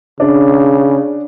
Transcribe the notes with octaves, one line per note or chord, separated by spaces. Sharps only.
C#3 D4